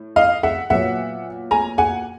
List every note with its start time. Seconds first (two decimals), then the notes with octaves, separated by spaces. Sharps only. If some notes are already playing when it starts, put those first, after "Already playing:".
Already playing: A2
0.16 D#5 F5
0.43 E5 F#5
0.70 A#2 F#3 B3 E5 F#5
1.51 G#5 A#5
1.78 F#5 G#5